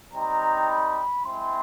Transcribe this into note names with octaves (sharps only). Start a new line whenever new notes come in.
G3 C4 D#4 A#5
B5
G#3 C4 E4 C6